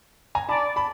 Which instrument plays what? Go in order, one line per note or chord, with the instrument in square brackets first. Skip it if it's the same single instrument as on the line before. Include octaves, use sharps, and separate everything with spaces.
[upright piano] G#5 A#5
[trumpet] D5 [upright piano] A5 B5
[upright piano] A5 B5